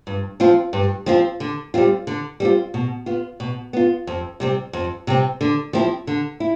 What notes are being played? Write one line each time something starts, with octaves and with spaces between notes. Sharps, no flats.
G2
F3 C4 F4
G2
F3 C4 F4
D3
G3 C4 F4
D3
G3 C4 F4
B2
B3 F4
B2
B3 F4
F2
C3 G3 C4
F2
C3 G3 C4
D3
F3 C4 E4
D3
E4